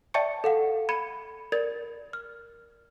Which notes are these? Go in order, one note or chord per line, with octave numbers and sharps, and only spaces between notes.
D5 E5 G5 A5 C#6 C#7
A4 F5 F#5
B5 G#6 C#7 D#7
A#4 D5 G#6 A6
F6